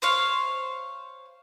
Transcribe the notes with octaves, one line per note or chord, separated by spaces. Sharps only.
C5 C#5 F5